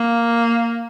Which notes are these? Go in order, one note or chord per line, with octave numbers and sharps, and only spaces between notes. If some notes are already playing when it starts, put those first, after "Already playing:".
Already playing: A#3